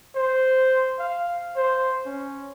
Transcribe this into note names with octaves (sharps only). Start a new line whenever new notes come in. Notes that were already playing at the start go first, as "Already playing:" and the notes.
C5
F5
C5
C#4